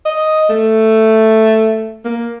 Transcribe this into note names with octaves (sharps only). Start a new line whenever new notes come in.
D#5
A3
A#3